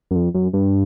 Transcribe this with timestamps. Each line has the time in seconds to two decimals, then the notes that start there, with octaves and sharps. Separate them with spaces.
0.11 F#2
0.15 F2
0.34 F#2
0.53 G2